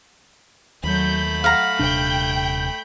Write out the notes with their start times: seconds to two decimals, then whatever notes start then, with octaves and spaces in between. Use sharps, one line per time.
0.84 D#2 F#3 A3 B5 G6
1.44 F5 F#5 A#5
1.79 D#1 C3 D4 G5 G6